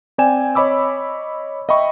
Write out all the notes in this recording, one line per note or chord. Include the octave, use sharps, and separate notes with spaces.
C4 D5 G5 G#5 E7
C#5 D#5 B5 D6 E6
D#5 E5 G5 B5 C#6